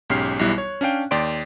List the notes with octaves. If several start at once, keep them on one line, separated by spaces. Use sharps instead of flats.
B1 G#2 C#4 G4 F6 C7
B1 E2 G3 E4 F#6
C#5
C#4 D4 F5 G5
D#2 D5 G5 C6 D7